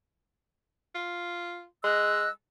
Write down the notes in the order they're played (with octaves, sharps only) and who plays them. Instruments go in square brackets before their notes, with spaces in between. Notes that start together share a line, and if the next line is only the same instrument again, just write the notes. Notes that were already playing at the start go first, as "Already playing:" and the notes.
[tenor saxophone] F4
[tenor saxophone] G#3 [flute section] D#5 E6 F#6